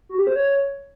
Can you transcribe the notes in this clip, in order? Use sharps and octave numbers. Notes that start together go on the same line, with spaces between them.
F#4
G4
C5
C#5